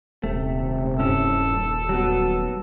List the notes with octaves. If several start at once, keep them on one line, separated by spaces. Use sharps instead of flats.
D#1 C3 A3
G2 C#4 E4 A4
F#3 G3 B3 F#4